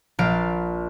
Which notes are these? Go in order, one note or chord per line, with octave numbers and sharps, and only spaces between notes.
A#1 F5 A6 D7